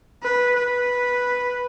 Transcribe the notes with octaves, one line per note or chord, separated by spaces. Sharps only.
B4
B4